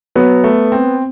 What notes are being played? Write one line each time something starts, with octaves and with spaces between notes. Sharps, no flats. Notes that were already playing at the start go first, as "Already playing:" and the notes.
F#3 B3
A3
C4